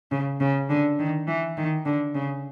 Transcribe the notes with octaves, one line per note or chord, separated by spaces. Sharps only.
C#3
C#3
D3
D#3
E3
D#3
D3
C#3